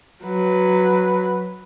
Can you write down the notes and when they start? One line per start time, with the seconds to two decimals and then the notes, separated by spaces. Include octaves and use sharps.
0.25 F#3 B4